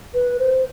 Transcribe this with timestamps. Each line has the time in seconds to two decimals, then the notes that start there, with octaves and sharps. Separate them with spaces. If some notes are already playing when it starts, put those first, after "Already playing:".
0.14 B4
0.39 C5